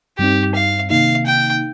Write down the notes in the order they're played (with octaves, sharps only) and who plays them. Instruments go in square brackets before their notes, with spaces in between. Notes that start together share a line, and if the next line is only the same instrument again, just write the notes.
[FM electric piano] G2 G3 C4 D#4 [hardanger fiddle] G4
[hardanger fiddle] F5
[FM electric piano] C3 D#3 A#3 D#4 [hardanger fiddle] F5
[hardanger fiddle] G5